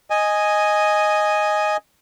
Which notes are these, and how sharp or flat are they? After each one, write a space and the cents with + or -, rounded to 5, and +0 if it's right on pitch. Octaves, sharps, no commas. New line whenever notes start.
D#5 +0 G#5 +0